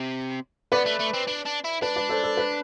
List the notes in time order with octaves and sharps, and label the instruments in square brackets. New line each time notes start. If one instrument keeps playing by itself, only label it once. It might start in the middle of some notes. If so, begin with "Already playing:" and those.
Already playing: [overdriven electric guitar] C3
[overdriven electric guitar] B3 [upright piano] B4 D5
[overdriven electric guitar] A3
A3
C4
D4
D4
E4
[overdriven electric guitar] D4 [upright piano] B4
[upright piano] B4 D5
A4 C5
A4
B4